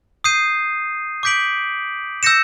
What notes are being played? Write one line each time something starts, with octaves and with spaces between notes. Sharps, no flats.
D#6 G6 C7 D#7
D6 G6 B6 D7 F#7
E6 G6 A#6 C#7 E7